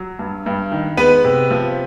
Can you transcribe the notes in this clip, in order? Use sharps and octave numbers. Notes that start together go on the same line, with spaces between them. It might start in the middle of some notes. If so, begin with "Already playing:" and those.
Already playing: F#3
G2
G2
D#3
G#3 B3 B4
C3
F3